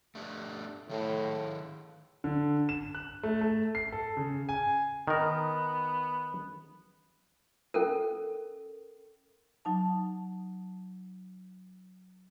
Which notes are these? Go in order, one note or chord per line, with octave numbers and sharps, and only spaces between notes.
A3 D4 G4
A2 D#3 G#4 A4
D3
E7
F#6
A3
A3
C7
A4
C#3
G#5
D#3 B3 A#4
C#4 A4 A#4
F#3 D#4 A5